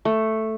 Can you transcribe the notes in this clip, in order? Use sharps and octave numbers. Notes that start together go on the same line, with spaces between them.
A3